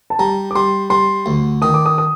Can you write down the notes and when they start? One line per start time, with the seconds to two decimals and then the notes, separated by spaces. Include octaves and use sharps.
0.10 A5
0.19 G3 A#5
0.51 D6
0.55 G3 C6
0.90 G3 C6
1.26 D2
1.62 D#3 D#6
1.74 D6
1.86 D#6
1.98 D#6